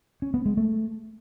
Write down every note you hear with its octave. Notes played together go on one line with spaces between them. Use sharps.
C#4
B3
G#3
A3